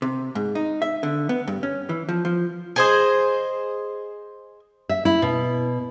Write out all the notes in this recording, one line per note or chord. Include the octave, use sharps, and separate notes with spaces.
C3
G#2
D#4
E5
D3
B3
G2
C#4
E3
F3
F3
G#4 C5 D#5
E5
E4
B2